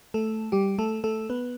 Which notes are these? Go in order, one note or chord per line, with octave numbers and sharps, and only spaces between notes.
A3 A4
G3 G4
A3 A4
A3 A4
B3 B4